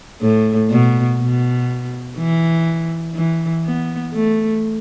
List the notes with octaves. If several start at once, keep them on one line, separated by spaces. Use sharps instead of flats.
A2
B2
B2
E3
E3
B3
A3